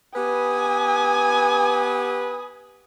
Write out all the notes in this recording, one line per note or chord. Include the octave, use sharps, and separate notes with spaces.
B3 G4 B4 G#5 D#6